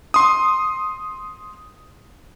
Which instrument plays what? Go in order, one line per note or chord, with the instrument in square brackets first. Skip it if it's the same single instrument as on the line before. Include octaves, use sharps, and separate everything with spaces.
[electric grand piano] C6 D#6